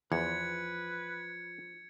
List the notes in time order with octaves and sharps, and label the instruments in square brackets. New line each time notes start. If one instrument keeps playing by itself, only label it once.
[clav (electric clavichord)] E2 [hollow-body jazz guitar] F3 [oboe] B4 [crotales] G#6 C#7